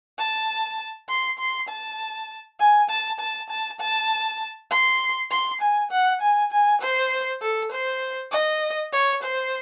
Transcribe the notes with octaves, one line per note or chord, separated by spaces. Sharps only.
A5
C6
C6
A5
G#5
A5
A5
A5
A5
C6
C6
G#5
F#5
G#5
G#5
C5
A4
C5
D#5
C#5
C5